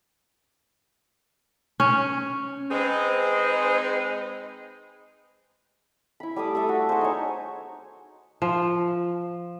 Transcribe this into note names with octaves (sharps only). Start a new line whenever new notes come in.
C#4
G#3 C4 D#4 G#4 B4 C5
E4 B5
G3 A3 D6 D#6
A3 A4 E5
F#4
F#4 G#4 C5
D#4 C#5
F3